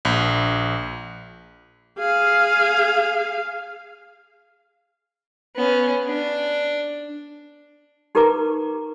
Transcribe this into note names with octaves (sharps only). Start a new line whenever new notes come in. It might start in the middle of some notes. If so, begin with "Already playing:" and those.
A#1
G#4 F5
B3 C#4
D4
D#4 G4 A#4 B4 A#5 D6